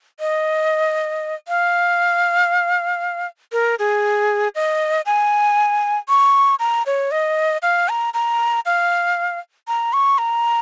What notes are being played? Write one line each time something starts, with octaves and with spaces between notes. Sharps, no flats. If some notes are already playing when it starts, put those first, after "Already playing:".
D#5
F5
A#4
G#4
D#5
G#5
C#6
A#5
C#5
D#5
F5
A#5
A#5
F5
A#5
C#6
A#5